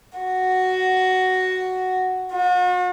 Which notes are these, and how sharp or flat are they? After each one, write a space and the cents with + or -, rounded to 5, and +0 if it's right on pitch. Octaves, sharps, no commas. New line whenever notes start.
F#4 +5
F#4 -45